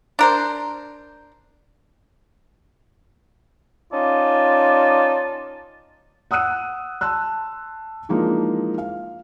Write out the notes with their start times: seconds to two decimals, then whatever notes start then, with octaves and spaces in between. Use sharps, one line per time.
0.19 D4 A#4 C5
3.93 C#4 D#4 F4 D5 A5
6.31 F#5 D#6 E6 F#6 D#7
7.01 A5 C6 E6 F#6
8.09 E3 F3 G#3 A#3 D4 D#4
8.78 F5